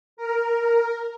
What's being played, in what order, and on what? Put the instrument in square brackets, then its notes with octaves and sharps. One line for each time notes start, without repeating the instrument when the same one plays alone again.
[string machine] A#4